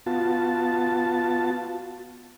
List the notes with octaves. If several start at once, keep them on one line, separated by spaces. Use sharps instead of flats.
B3 F4 F#4 A5